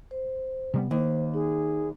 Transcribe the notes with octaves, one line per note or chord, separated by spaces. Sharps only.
C5
C3 G3 B3
D#2 D#3 C5
D#4 G#4